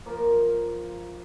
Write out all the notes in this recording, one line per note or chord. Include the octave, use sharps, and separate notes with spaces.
F3 A#3 A#4